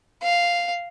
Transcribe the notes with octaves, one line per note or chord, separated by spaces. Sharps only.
F5